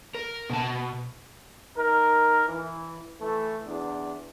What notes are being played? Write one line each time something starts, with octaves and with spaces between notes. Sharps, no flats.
A#4
B2 A5
D#4 A#4
E3
E3 A3
E2 B3 D4